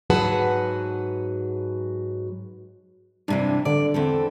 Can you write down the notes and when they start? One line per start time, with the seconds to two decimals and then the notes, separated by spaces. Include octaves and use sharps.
0.10 G#2 F#3 G#4 B4 F#5 A5
3.28 G2 C3 E3 D4
3.65 D3 D5
3.94 E2 C4 A4